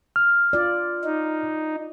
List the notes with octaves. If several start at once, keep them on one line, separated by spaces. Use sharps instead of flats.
F6
F4 D5
D#4